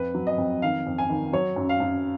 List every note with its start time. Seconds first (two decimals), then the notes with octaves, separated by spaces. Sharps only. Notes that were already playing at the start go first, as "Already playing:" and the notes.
Already playing: F2 B4
0.14 F#3
0.27 D#5
0.38 F2
0.62 D#3 F5
0.87 F2
0.98 G#5
1.09 D#3
1.33 F#3 C#5
1.56 F#2
1.69 F5
1.80 F#2